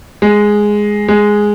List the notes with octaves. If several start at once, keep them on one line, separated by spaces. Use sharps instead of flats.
G#3
G#3